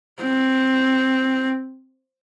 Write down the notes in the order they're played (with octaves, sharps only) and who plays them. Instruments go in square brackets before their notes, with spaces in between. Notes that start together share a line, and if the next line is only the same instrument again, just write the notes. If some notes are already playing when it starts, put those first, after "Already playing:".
[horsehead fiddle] C4